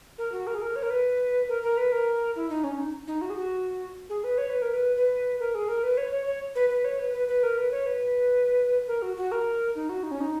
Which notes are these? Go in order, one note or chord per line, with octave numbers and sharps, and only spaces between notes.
A#4
F#4
A#4
G#4
A#4
C#5
A#4
B4
A#4
A#4
B4
A#4
E4
D#4
C#4
D#4
D#4
F#4
G#4
F#4
G#4
B4
C#5
B4
A#4
B4
B4
A#4
G#4
A#4
B4
C#5
C#5
C#5
B4
B4
C#5
B4
B4
B4
A#4
B4
C#5
B4
A#4
F#4
F#4
A#4
D#4
F#4
D#4
C#4
D#4